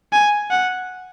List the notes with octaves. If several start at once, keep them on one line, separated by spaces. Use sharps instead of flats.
G#5
F#5